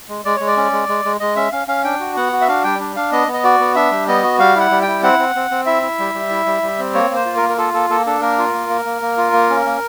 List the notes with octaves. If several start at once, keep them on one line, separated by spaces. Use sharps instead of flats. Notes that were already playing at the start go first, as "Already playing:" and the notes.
G#3
G#3 D5
G#3 C#5
D5
C#4
G#3
G#3
G#3
G#3 D#5
C#4 E5
C#4 F5
C#4 F5
D4 G5
F#4
B3 F#5
F#4
E5
D4 F5
G3 G5
D4
D4 F5
B3 D#5
B3
D#5
F#4 D5
B3
D4 E5
G3
B3 D#5
F#4
G3 F5
E4 F#5
G3
E4 G5
C4 F#5
C4
C4
C4
E4 E5
E4
G3
G3
E4
G3
G3
C4
A#3 C#5
A#3 C5
F4
A#4
A#3
A#4
F4 A4
A#3 A4
A#3 A4
D4 A4
A#3 A#4
F4
A#3
A#3
A#3
A#3
F4
A#3
C#4
A#3